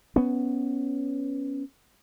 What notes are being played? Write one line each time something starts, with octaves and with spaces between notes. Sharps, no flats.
B3 C#4